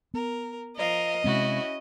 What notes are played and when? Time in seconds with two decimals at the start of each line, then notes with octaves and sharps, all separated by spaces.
0.14 B3 A#4
0.77 F3 A#4 D#5 F5
1.24 C3 G#3 C4 C#4 E4 F#4